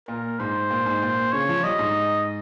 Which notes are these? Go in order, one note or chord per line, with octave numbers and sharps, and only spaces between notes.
A#2 A#4
G#2 C5
A#2
G#2
A#2
C#3 C#5
F3
G3 D#5
G#2